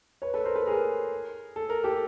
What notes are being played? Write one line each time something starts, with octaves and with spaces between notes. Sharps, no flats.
B4 C#5
A4 B4
A#4 C5
A4 B4
G#4 A#4
A4
A#4
G4 A4